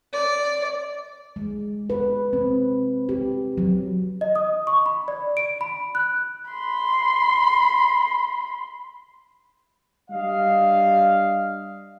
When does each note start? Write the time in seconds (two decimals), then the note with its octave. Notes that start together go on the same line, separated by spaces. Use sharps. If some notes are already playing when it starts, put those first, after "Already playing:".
0.13 D5
1.36 G#3
1.90 B4
2.33 C4
3.09 G4
3.58 F#3
4.21 D#5
4.36 D#6
4.67 C#6
4.86 B5
5.08 D5
5.37 D7
5.61 B5
5.95 F#6
6.51 B5 C6
10.11 G3 D4 D#5 F5